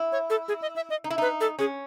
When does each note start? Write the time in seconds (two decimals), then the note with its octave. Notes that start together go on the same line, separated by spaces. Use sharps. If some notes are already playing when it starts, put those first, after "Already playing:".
Already playing: E4
0.12 C#5
0.30 A4
0.48 G#4
0.62 D#5
0.76 E5
0.90 D#5
1.04 D#4
1.10 E4
1.18 D#4 B4
1.41 A4
1.59 C#4 G#4